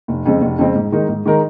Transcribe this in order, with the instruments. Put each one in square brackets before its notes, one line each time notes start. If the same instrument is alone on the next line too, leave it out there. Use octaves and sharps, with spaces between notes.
[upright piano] F1
F2 C#3 G#3 C4
F1
F2 C#3 G#3 C4
G#2
D#3 G#3 D#4 A#4
G#2
D#3 G#3 D#4 A#4